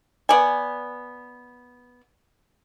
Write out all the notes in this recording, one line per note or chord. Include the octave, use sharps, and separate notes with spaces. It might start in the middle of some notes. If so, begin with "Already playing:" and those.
B3 D5 G#5